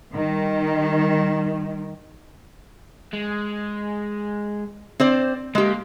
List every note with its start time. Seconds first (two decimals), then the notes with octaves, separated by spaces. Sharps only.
0.14 D#3 G3
3.13 G#3
5.00 C4 C5 D5
5.55 G#3 A#3 G4